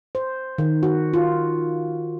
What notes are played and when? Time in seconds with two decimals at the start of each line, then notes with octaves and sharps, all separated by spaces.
0.15 C5
0.58 D#3
0.83 F#4
1.14 F4